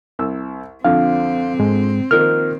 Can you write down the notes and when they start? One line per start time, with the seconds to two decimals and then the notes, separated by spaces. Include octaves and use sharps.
0.19 C2 E6
0.85 F2 D3 C4 D4 F5
1.59 G#2 G#3
2.11 D#3 F3 A#3 F6